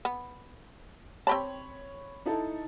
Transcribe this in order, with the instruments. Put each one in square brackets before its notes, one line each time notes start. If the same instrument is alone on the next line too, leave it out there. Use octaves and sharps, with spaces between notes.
[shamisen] B3
[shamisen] C4 G4 A5 [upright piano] C#5 B5
[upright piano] D#4 E4 A4